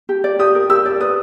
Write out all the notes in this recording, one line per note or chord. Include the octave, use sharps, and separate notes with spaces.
G4
D5
G4 D#6
A#4
G4 E6
D5
B4 D#6